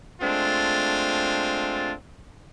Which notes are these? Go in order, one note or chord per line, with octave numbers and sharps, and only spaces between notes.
G#3 A3 C4 D4 F4